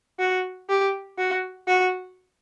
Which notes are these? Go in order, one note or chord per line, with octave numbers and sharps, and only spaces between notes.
F#4
G4
F#4
F#4